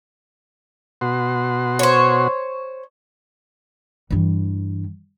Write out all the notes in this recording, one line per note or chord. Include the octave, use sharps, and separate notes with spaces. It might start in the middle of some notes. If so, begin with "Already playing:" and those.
B2 F#4 C6
C5 C#5
G2 E3